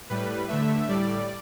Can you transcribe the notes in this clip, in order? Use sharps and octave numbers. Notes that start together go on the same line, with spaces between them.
A2 G3 B4
D3 A3 E5
A2 G3 D5